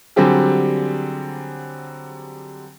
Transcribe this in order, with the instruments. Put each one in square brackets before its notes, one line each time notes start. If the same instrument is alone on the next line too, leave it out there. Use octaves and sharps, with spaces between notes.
[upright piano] D3 F#3 G3 C4 G4 G#4